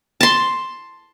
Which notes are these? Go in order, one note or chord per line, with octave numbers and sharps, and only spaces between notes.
A5 C6